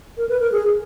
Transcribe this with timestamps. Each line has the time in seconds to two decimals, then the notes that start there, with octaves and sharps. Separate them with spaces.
0.17 A#4
0.29 B4
0.40 A#4
0.52 G#4